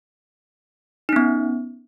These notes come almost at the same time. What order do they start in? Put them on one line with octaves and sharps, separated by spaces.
D#4 C#4 B3